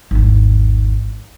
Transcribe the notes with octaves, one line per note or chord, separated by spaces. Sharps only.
G#1 E2